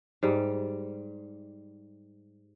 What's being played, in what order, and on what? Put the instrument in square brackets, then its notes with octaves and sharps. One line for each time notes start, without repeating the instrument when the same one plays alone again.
[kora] G#2 G3